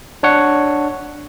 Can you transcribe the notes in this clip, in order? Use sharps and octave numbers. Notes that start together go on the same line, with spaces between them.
D4 C#5 F#5